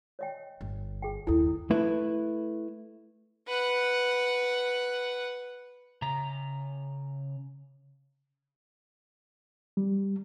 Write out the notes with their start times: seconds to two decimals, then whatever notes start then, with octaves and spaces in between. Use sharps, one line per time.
0.19 C#5 D#5 G5
0.61 G1
1.02 G#4 G5
1.27 F#1 D#2 E4 A4
1.71 A3 E4 B4
3.48 B4 F#5
6.02 C#3 A#5
9.77 G3